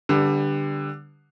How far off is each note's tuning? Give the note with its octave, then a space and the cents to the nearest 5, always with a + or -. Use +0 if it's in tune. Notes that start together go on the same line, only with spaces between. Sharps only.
D3 +0 G3 +15 B3 +0